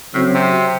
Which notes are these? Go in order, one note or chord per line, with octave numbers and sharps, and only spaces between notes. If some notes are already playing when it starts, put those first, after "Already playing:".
A2 C#3 F#3 C4
C3